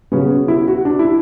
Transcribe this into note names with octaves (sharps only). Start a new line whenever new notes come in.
C#3 F#3 B3 C#4
E4
F#4
D4
E4